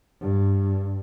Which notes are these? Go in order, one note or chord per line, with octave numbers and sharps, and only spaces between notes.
G2